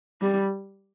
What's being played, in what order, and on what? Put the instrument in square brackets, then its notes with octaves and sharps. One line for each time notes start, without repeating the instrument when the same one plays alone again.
[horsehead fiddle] G3